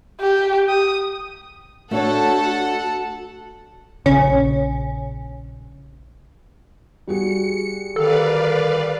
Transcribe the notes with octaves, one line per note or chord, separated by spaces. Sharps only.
G4
D#6
A3 D4 F#4 A4 C#5 F#5
A#1 C#3 C#4
G3 F#4 G#4 C#7
D3 D#3 A4 B4 D5 F5